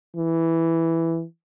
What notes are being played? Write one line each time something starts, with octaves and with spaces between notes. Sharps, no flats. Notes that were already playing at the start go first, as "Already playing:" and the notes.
E3